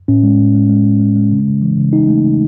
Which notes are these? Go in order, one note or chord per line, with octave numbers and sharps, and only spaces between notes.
A2 C#4
G#3
A2
G#3
G#3
A2
G#3
G#3
C#3
C#3
E3
C#3
C#3 D#4
A3
C#3